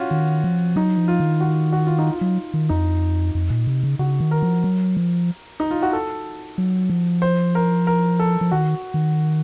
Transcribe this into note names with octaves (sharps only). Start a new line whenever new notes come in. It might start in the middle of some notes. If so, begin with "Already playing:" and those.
Already playing: C#4 F4 F#4
D#3
F3
F#3 D#4
F3
F4
D#3
F#4
F#4
F4
D#4
F4
F#3
D#3
F2 D#4
F2
A#2
C3
C#3
C#3 F#4
D#3
A#4
F3
F#3
F3
D#4
F4
F#4
A4
F#3
F3
C5
A#4
A#4
A4
F3
D#3 F#4
D#3